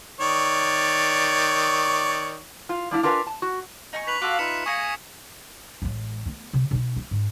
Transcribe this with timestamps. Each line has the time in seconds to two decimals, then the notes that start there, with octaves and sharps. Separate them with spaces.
0.20 D#3 C#5 D5
2.69 F4 F5
2.91 G3 D4 E4 F5
3.03 D4 F4 A#4 B4 F#5 G#5
3.27 A5
3.42 F#4
3.93 D#4 G#5 C#6
4.07 B4 B6 F7 F#7
4.22 F4 F#4 A4 F5 D6 F#6
4.39 D#4 F4 B4 E5 B6 C#7 E7
4.66 A#3 G#4 G#5 C#6 D#6 A#6 C#7
5.82 A1 G#3
6.26 A3 B3
6.53 C3
6.71 B2 D#4
6.96 C4
7.11 G#2